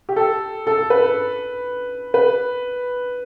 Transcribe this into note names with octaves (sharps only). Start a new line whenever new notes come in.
G4
A4
A4
B4
B4